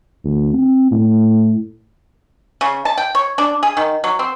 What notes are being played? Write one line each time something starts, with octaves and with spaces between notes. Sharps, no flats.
D2
C4
A2
C#3
A5
G5
C#5
D4
G#4
D#3
F#3
C4